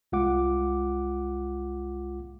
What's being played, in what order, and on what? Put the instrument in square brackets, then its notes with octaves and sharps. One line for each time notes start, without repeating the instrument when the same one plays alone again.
[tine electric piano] C2 G#3 F4 F#5 D6